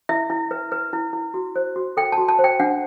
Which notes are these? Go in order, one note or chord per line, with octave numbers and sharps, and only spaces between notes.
E4 E5
E4
B4
B4
E4
E4
F#4
C5
F#4
A4 G5
A5
F#4
A5
C5
G5
D4 F#5